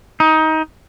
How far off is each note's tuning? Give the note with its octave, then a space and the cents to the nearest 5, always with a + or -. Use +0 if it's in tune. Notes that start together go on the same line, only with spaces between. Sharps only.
D#4 +20